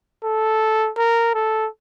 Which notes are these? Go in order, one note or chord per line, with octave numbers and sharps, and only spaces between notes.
A4
A#4
A4